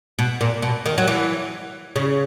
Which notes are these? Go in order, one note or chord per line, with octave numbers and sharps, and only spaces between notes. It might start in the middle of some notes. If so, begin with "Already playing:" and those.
B2
A#2
B2
D#3
F#3
E3
C#3